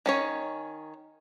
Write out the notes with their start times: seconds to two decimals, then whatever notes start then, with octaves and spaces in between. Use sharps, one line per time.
0.06 D#3 C#4 C#5